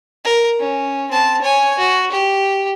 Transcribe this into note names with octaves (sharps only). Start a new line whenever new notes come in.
A#4
C#4
C4 A5
C#5 G#5
F#4
G4